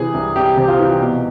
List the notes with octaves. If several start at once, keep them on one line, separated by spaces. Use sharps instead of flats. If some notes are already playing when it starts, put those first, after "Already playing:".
Already playing: C3 E3 G#4
C2
C2 G4
C3
F4
E3
B2